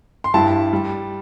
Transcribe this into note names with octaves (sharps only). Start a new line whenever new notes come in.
C6
G2 G3 E4 A5
G3